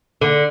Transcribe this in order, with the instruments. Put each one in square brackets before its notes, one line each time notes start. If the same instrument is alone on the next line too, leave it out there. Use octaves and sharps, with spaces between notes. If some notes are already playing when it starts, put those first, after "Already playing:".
[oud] D3